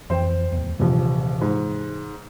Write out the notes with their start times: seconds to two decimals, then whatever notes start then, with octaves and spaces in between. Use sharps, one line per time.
0.10 F2 E3 C5 G5
0.52 D1 G1 E2
0.79 D#1 A#1 C3 E3
1.41 G#2